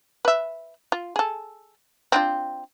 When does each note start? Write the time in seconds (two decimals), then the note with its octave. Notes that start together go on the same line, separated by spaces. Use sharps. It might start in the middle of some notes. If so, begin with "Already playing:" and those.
0.25 B4 E5
0.92 F4
1.16 G#4 A4
2.12 C4 D4 F4